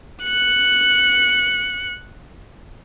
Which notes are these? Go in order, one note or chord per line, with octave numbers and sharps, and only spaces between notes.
F#6 C#7